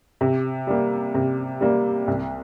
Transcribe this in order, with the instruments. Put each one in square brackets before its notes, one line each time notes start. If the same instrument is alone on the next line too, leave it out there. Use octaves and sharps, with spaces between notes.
[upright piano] C3
G3 A#3
C3
G3 A#3
C2